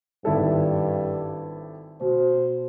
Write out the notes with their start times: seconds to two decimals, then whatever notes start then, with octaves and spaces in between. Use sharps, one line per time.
0.25 G#1 G2 E4 A4
2.01 B2 C5